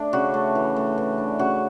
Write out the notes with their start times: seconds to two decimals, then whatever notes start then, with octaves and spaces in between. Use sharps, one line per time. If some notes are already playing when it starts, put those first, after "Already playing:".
Already playing: A3 D4
0.13 C#3 F#4
0.34 A3
0.55 E3
0.76 A3
0.98 E3
1.18 D4
1.39 C#3 F#4